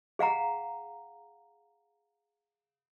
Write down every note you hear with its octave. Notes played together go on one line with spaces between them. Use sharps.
G#4 F5 F#5 A#5